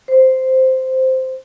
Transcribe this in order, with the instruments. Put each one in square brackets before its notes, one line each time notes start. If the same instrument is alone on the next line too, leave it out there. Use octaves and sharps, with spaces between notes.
[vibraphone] C5